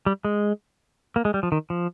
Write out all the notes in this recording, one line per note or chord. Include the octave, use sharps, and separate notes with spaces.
G3
G#3
A#3
G#3
G3
F3
D#3
F3